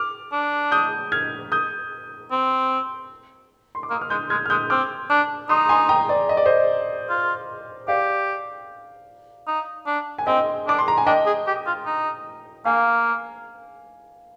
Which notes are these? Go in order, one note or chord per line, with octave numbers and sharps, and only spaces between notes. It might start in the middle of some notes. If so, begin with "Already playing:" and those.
Already playing: D6 F6
D4
D#6 G6
F6 G#6
D#6 G6
C4
C6
D6
A#3 D#6
F6
G#3 D#6 G6
G#3 F6 G#6
F6
G#3 D#6 G6
C4 D6 F6
D4
D#4 C6 D#6
G#5 C6
G5 A#5
D5
D#5
D5
C5 D#5
F4
G4 D5 F5
D#4
D4
G#5
C4 D#5 G5
D4 D6
C6
A#5
G#5
D4 D#5 G5
G#4
G4
F4
D#4
A#3 F5 G#5